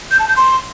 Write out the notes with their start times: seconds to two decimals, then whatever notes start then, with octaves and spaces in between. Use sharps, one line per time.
0.11 G6
0.19 A5
0.28 G6
0.37 C6